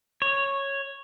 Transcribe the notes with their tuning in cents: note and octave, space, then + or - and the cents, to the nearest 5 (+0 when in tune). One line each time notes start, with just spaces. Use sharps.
C#5 -5